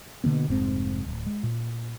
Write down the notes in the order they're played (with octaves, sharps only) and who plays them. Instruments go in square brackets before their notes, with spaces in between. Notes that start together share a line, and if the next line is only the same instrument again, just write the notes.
[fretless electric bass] B2 D3 A#3 B3
F1 G#2 C#3 C4
D1
G#3
A#2